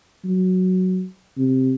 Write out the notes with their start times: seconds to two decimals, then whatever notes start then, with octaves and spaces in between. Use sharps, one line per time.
0.24 F#3
1.38 C3